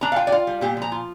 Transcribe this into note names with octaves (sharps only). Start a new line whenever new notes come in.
D4 A#5
F5
F4 G5
D5
F4 F5
G3
A#2 G4
F3 A#5
F4